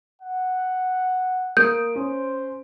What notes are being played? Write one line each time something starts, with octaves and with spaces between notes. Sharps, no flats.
F#5
A#3 D#6 G6 D7
C#4 C5